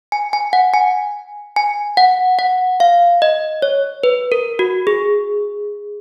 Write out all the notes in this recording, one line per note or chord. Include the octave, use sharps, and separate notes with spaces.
G#5
G#5
F#5
G#5
G#5
F#5
F#5
F5
D#5
C#5
B4
A#4
F#4
G#4